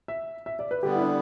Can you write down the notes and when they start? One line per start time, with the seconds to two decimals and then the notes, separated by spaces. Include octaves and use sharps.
0.08 E5
0.46 E5
0.59 D5
0.71 B4
0.83 D3 G3 B3 G4
0.96 E4
1.01 D4